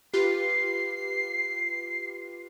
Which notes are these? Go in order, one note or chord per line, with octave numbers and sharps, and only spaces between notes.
F4 G4 B4 C7